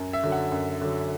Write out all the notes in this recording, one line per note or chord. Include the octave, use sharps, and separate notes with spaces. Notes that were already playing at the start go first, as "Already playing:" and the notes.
Already playing: F#2
E5
D3 F#3
F#5
F#2
D3 F#3